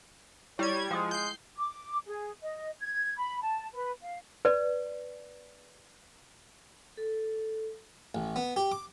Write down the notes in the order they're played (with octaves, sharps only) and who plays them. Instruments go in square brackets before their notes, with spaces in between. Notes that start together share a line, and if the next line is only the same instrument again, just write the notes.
[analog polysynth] G3 G#6 [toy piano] E4 [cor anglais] C#5
[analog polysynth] F3 [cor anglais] G#3 [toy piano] G5 D#6
[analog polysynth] G6 C7
[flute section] D6
G#4
D#5
G#6
B5
A5
B4
F5
[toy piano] B4 D5
[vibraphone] A4
[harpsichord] A1
B3
G4
D6